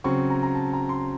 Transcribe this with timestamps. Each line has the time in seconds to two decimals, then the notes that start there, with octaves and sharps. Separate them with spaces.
0.04 C#3 F#3 C4 C#6
0.30 A#5
0.43 A#5
0.55 A5
0.73 A#5
0.89 C6